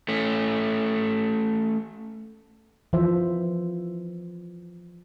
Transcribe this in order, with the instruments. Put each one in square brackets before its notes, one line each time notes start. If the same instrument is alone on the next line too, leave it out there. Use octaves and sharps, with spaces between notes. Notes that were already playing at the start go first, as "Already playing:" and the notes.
[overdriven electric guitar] A3 C#4
[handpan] E3 F3 C5 E5